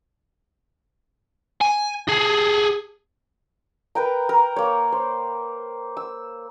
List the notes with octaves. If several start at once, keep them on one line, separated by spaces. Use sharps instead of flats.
G#5
G#4 A4
A#4 B4 G5 A#5
A#4
A#3 C#5
C5
E6